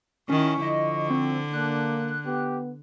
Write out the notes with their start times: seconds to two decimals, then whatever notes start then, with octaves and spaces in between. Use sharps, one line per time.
0.29 D#3 C#4 E4 C#6
0.62 D3 F3 D#5
1.10 C4
1.53 A#3 D4 F#6
2.26 B3 G4